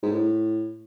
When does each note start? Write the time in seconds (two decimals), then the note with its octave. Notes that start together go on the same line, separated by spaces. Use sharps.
0.02 G#2
0.12 A2